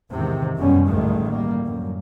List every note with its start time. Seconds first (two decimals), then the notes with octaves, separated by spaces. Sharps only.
0.12 E2 G#2 C3 D#3
0.56 F1 F#2 B2 G3 C#4
0.87 A1 D2 G2 D#3 G#3 A3
1.29 G3 A#3
1.64 F#2